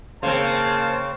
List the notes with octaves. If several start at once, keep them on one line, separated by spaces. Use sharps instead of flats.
C#3 A#3 C4 C5 A5